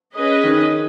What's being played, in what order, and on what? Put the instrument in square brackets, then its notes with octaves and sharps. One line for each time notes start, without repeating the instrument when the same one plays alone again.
[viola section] C#4 G#4 B4 D#5
[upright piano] D#3